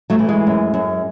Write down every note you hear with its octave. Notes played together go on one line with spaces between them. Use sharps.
F#3 A3
E3
G#3
F#2
F#2